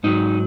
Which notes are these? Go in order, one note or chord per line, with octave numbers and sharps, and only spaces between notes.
G#2 F#3 D#4